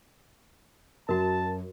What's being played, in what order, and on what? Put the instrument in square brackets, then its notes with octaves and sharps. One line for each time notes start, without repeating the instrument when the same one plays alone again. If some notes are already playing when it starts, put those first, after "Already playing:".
[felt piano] F#2 [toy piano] F#4 A#4 [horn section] A5